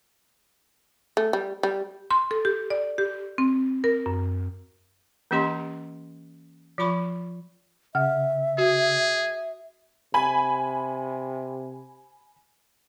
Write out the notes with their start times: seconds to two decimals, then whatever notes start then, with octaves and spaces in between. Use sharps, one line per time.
1.17 A3
1.33 G3
1.63 G3
2.11 C6
2.31 A4
2.45 G4
2.70 D5
2.98 G4
3.38 C4
3.84 A#4
4.06 F#2
5.31 E3 A#3 C#4 G4 D#5 C6
6.78 F3 F4 B5 C#6
7.95 C#3 E5 F#5 F6
8.58 F#4 G#4
10.14 C3 G#5 B5